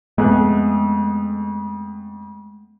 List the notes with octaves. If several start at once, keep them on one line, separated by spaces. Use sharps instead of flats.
F2 G#3 A3 B3 G#4 F#6